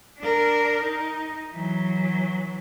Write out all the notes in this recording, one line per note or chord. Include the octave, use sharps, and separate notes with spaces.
D4 A#4
D#4
E3 F#3